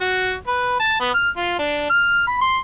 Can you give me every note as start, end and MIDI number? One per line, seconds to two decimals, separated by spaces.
0.01 0.34 66
0.48 0.78 71
0.80 0.97 81
1.01 1.13 59
1.14 1.29 89
1.37 1.57 65
1.59 1.85 62
1.90 2.26 89
2.27 2.40 83
2.41 2.58 84